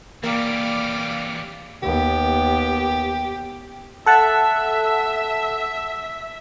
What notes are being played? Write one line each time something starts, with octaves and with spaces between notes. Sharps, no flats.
E3 G3 A#3 D5 F5 G5 D6
D#2 B3 G4
A4 E5 F#5 A5